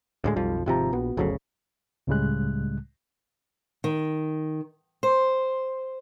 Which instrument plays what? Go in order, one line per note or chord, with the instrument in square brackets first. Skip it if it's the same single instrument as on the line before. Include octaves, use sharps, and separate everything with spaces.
[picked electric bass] D2 A2 G#3
[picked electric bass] B1 F2 F3 [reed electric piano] G3
[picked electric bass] G#1 C3 F3 [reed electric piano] F4 G4 A#5
[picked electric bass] A#1 [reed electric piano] B3 F#4
[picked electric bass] G1 D2 C#3 [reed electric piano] F#3 A4
[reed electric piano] C#2 A2 C#3 G3 G#3 F#6
[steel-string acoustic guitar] D#3
C5